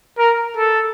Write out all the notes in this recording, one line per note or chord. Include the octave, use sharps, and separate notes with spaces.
A#4
A4